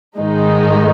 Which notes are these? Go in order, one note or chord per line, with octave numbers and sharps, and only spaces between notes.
G#2 D#3 G#3 D#4